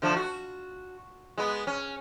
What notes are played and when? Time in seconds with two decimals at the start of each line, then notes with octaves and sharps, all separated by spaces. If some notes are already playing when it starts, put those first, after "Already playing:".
0.02 D3 F3 A3
0.16 F#4
1.38 G#3 B3
1.67 C#4